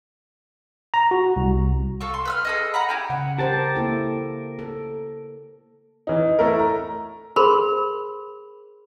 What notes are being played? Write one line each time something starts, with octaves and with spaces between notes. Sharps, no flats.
A#5
F#4
C2
F4 A4 C#6
C6
B4 E6 F6
G#4 A4 D#5
F#5 A#5 B5
E4 G4 G#5
C#3 F#5
G4 A#4 C5 A5
A#3 E4 A4
A4
E3 D#4
A3 E4 A#4
A#5
G#4 A#4 C5 B5 C6